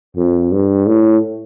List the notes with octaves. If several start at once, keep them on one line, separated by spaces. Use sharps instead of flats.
F2
G2
A2